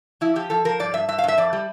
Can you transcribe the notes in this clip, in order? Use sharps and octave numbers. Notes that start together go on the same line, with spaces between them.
F3 E4
F3 G4
F3 A4
F3 A#4
G2 D5
G2 E5
G2 E5
F5
G2 E5
F2 D5
G3